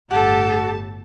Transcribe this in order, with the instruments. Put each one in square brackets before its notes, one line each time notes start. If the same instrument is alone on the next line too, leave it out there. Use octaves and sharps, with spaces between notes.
[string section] G1 A2 A5 [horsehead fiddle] G4 A4 [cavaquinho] F#5